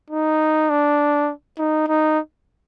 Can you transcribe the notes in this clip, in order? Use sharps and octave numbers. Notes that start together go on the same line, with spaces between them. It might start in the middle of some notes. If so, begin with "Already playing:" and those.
D#4
D4
D#4
D#4